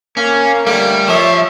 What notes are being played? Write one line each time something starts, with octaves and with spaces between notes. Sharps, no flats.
A#3 C#4
D3 G3 A3 A#3
F3 C#5 E5